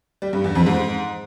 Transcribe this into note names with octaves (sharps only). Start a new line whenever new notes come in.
G3
G2
E2
F2
G#2